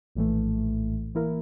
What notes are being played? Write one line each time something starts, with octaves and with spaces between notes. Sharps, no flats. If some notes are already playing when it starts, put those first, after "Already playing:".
A#1 A2 E3 A3
E3 A#3 E4 A#4